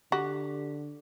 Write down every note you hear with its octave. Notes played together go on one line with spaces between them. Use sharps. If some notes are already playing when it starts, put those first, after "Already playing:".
D3 F#4 G4